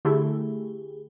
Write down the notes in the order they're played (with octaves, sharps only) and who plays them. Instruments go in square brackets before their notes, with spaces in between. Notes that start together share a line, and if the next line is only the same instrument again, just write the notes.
[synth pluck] D3 A3 E4 [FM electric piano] G4 G#4